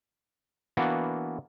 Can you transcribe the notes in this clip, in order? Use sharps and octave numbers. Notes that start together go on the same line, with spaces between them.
E3 A#3 B3 D4 F#4